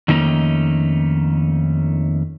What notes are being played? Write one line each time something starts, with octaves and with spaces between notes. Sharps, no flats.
F2 D#3 A3 A#3 C#4 D#4